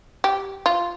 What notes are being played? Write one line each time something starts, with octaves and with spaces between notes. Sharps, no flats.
G4
F4